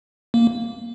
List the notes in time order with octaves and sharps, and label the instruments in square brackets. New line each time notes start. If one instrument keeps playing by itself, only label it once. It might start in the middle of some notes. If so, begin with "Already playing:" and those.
[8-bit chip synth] A#3